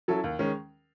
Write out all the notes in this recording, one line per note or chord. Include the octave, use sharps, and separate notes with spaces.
F#3 C#4 E4 A4
D#2
D#3 G#3 C#4